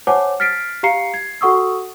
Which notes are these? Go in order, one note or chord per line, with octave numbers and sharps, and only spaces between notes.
C5 C#5 F#5 G#5 A5 D6
F6 A6 B6 C7 D7
G4 F5 A#5 C7 C#7
G#6 C7
F#4 A4 F#5 C#6 D#6 E6